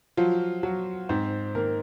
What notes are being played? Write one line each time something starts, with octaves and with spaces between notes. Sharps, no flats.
F3 F#3 F4
F#3 F#4
G#2 C4 C5
D#3 A#3 A#4